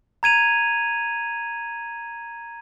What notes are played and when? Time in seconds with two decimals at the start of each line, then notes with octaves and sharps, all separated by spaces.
0.23 A#5 G#6 D#7 F7